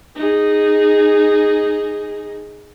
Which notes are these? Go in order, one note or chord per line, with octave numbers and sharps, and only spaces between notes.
D#4 G#4